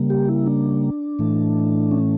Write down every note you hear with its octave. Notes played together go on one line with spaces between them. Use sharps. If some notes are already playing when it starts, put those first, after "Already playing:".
Already playing: C#3 G3 A#3
G4
E4
D4
A2 E3 A3
C#4